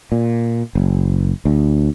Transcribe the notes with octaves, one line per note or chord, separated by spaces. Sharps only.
A#2
F#1
D2